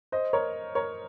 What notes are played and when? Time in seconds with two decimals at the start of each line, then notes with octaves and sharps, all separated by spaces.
0.12 C5 D#5
0.33 A#4 C#5
0.75 A#4 C#5